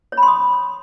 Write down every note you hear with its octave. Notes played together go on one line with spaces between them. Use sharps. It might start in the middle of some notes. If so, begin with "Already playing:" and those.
C#5
B5
C6
D#6